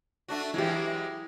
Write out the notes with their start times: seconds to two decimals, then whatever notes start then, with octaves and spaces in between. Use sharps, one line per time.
0.28 A3 D4 F#4
0.54 E3 F#3 G#3 E4 G4